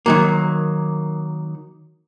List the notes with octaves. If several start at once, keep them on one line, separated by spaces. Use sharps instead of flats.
D#3 F#3 A#3